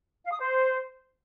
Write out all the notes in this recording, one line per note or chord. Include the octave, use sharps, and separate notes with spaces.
F5
D#6
C5